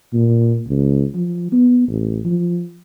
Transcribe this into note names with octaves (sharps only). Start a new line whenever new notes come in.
A#2
C#2
F3
B3
A1
F3